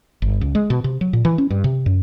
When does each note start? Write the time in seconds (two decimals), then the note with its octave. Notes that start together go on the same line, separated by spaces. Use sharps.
0.22 G1
0.41 C#2
0.55 G#3
0.70 B2
0.84 C3
1.01 F#3
1.13 A#2
1.25 E3
1.38 C#4
1.50 G2
1.64 C3
1.86 F#2